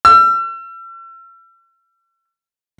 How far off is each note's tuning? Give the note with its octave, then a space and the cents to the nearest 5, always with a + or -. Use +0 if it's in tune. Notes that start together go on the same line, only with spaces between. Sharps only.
E6 +40